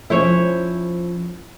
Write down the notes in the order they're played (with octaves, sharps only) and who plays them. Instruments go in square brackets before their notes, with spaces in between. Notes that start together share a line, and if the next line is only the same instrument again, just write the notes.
[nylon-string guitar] F3 C#4 [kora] E4 C5 C#5